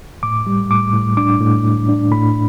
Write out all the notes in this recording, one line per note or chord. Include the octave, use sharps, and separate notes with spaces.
A2 D6
G3
A2 D6
A2
D4 D6
A2
A2
D4
A2 B5